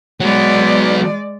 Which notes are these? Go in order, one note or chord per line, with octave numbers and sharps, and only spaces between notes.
F#3 G#3 B3 D5